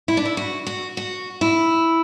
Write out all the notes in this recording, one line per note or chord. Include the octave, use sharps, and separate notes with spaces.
E4
D4
E4
F#4
F#4
F#4
E4